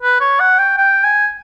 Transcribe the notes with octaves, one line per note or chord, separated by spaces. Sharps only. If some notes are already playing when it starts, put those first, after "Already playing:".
B4
C#5
F#5
G5
G5
G#5